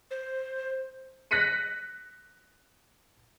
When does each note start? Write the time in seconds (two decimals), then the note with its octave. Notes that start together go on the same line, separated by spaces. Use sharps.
0.11 C5
1.31 F#6 A#6 B6 C#7 D#7